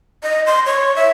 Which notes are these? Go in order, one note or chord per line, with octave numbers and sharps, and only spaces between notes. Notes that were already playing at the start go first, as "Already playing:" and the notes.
D#5
C6
C#5
E5